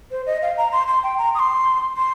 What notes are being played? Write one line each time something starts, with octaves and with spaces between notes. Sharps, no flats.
C5
D#5
F5
A#5
C6
C6
G5
A#5
D#6
C6
C6